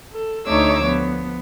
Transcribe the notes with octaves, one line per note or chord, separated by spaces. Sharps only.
A4
D2 A3 D#4 C#5 D6 E6
F3 B3